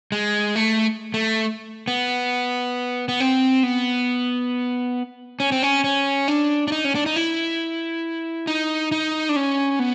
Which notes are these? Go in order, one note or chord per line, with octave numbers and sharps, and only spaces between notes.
G#3
A3
A3
B3
B3
C4
B3
C#4
C4
C#4
C#4
D4
D4
D#4
C#4
D4
D#4
E4
D#4
D#4
D4
C#4
B3